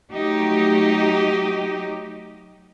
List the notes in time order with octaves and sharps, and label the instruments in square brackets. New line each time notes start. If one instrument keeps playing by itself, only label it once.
[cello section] F#3 A3 D#4 G4